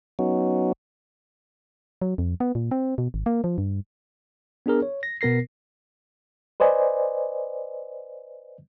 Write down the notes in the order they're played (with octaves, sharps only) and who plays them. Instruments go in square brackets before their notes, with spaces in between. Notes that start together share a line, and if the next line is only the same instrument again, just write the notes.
[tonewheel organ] F#3 B3 C#4 D#4 F#4
[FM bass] F#3
F2
B3
A#2
C4
B2
G#1
A#3
F3
G2
[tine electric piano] B3 D4 G#4 A#4
C#5
A#6
B2 B3 A#4 A#6 C7
[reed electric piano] B4 C5 D5 D#5 G#5